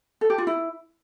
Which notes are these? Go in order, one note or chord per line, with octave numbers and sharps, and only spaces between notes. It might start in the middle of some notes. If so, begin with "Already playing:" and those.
A4
G4
F4
E4